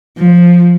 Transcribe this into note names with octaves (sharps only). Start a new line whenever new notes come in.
F3